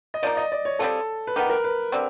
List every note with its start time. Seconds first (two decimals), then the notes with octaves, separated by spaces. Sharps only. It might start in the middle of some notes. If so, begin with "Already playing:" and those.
0.14 D#5
0.23 F3 A#3 D#4 D5
0.37 D#5
0.52 D5
0.65 C#5
0.79 G3 C4 F4 G#4 A4
1.27 B4
1.36 B3 D#4 G4 A#4
1.46 B4
1.50 A#4
1.64 B4
1.92 D3 G3 C4